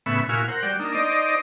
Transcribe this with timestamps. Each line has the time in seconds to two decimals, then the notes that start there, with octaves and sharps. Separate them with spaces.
0.06 A2 C#3 B3 E5 B5 C#6
0.29 A#2 E4 F#4 F5 G#5 C#6
0.48 A#4 C5 F#5
0.63 G3 F#4 D5 G5
0.79 A#3 D4 D#4
0.94 D#4 C5 D5 D#5